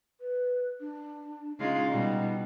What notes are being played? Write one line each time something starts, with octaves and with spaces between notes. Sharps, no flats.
B4
D4
C#3 G#3 D#4 F4
B2 G3